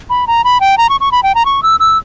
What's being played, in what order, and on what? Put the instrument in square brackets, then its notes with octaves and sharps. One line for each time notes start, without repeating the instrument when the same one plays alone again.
[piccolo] B5
A#5
B5
G5
A#5
C#6
C#6
B5
G5
A#5
C#6
E6
E6